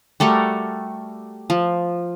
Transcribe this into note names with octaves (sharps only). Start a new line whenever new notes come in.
G3 A3 F#4 A#4
F3